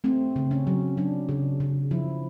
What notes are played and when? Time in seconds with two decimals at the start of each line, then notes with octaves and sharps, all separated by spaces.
0.04 A3 C4
0.36 C#3
0.51 C#4
0.67 F#3
0.97 F#3 D4
1.29 C#3
1.60 C#3
1.91 F3 E4